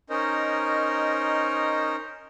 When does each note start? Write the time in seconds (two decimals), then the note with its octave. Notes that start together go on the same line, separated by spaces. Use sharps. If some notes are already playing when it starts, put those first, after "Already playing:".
0.10 C#4 D#4 A#4 C5 D#5